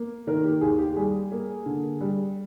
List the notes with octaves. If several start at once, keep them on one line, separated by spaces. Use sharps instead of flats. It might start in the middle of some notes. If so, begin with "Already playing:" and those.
Already playing: A#3
D#3 A#4
G4
D#2 G#4
G4
G3 G#4
A#3
D3
G3